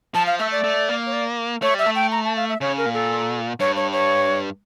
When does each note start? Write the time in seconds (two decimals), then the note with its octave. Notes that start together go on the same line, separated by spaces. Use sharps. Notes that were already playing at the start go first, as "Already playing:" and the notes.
0.15 F3 A5
0.27 F5
0.39 A3 E5
0.52 D5
0.64 A3
0.89 A#3
1.06 C#5
1.13 D5
1.62 A3 C#5
1.74 G3 E5
1.86 A3
1.95 G5
2.12 A#5
2.24 A5
2.36 F5
2.49 E5
2.61 C#3 C#5
2.78 A#4
2.86 A#2
2.94 A4
3.60 G2 C#5
3.76 C#5
3.92 C#5